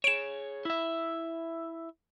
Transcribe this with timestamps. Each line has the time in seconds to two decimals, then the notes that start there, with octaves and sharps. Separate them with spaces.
0.04 G#4 C#5 D7 E7
0.65 E4 E5